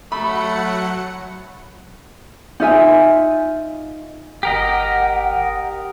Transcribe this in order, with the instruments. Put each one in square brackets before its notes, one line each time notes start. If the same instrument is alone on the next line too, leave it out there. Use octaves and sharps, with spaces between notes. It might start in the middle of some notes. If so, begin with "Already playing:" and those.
[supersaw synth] F#3 F#5 C#7 [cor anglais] A3 [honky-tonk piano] B5
[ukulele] D#4 F4 E5 G#5
[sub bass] G1 [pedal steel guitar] G4 A#4 D#5 [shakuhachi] F#5